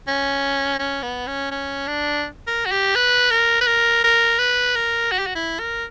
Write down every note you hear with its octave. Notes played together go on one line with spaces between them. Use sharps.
C#4
C#4
B3
C#4
C#4
D4
A#4
F#4
G4
B4
A#4
B4
A#4
A#4
B4
A#4
F#4
G4
F#4
E4
A#4